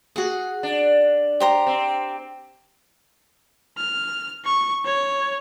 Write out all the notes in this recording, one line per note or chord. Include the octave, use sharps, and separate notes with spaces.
F#4 G#4 F#5
D4
G4 C5 A#5
C4
F6
C#6
C#5